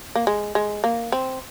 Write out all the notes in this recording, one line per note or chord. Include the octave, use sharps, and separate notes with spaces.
A#3
G#3
G#3
A#3
C4